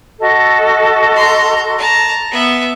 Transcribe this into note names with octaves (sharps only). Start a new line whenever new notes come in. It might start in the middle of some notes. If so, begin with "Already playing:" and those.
F#4 A4 D#5
A#5 C6
A5 A#5
B3 E5